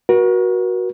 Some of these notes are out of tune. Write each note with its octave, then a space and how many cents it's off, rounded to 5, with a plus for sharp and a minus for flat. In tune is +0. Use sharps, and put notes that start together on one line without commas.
F#4 +0 A#4 +45